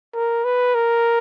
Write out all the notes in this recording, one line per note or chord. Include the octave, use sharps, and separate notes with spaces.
A#4
B4
A#4